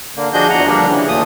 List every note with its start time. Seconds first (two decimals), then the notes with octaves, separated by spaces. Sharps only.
0.16 D3 A#3
0.34 F3 D4 F#4 G#4 D#5 G6
0.50 E2 F#5 A#5
0.66 D3 F3 G3 A#3 D4
0.88 C#3 E3
1.08 D#2 A#2 A3 D#6